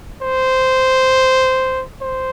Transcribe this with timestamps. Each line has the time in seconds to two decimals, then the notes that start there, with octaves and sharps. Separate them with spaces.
0.22 C5
2.02 C5